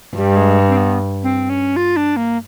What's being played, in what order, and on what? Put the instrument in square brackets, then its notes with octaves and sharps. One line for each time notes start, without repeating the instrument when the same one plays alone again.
[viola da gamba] G2 [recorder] G3
[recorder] G#3
C4
B3
C4
C#4
F4
D4
A#3